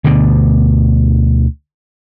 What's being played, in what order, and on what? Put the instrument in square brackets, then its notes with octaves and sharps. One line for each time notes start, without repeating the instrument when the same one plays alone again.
[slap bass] D2 B2 D3